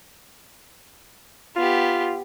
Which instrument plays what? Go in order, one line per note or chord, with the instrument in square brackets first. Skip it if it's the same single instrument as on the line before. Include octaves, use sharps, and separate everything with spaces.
[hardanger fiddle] B3 G4 [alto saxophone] F4